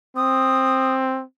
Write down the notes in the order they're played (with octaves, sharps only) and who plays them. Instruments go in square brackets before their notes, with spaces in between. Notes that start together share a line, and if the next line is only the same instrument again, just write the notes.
[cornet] C4 [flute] D#6